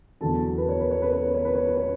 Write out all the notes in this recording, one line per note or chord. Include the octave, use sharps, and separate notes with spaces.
E2 D3 F#3 A4 A5
B4
C#5
B4
C#5
B4
C#5
B4
C#5
B4
C#5
B4
C#5